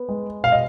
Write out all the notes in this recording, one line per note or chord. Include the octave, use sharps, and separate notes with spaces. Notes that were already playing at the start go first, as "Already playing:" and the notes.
Already playing: B3
G#3
B2 F5
D#5